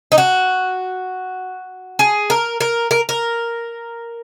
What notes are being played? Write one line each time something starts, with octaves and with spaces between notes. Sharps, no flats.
D#4
F#4
G#4
A#4
A#4
A#4
A#4